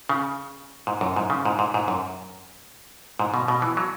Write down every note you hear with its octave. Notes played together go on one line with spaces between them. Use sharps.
C#3
G#2
F#2
G#2
C#3
G#2
G#2
G#2
F#2
G#2
B2
B2
E3
F#3